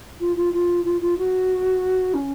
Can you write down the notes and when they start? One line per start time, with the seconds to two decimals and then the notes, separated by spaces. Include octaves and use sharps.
0.20 F4
0.36 F4
0.53 F4
0.85 F4
1.01 F4
1.18 F#4
2.14 C#4